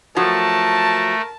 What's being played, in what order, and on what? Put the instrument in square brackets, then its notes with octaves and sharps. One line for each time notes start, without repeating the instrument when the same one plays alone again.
[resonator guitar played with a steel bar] F3 F#3 F#4 [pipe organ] A3 [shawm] A#4 [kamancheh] A5